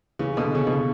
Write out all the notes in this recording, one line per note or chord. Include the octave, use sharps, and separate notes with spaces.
C#3 E3
B2 D3
C#3
B2
C#3